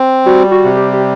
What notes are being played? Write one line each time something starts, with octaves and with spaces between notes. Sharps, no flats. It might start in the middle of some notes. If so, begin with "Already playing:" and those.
Already playing: C4
G3 F#4
F#4
C3
G4
G4